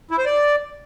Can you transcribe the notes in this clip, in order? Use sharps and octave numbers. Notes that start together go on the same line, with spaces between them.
E4
C5
D5